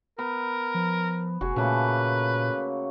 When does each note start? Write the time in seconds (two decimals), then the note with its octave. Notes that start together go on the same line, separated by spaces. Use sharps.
0.18 B3 A#4
0.74 F3
1.41 F1 F#4 G#4
1.56 A#2 C#3 A3 A#3 B4